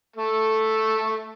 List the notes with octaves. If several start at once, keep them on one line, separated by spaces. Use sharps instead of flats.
A3 A4